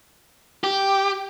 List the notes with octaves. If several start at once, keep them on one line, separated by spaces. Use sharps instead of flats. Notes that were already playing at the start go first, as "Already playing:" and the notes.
G4